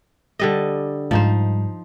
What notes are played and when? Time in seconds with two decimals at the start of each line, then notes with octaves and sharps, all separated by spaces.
0.39 D3 G3 D#5
1.11 G#2 F3 G3 D#4 C5